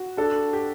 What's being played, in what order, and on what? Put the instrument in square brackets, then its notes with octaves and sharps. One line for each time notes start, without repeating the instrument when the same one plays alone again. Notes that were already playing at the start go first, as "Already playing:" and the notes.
Already playing: [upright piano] F#4
[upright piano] D4 [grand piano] A4
[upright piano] G4